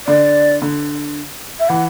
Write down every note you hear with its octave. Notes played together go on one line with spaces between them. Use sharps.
D3 D5
D3
E5
E3 F#5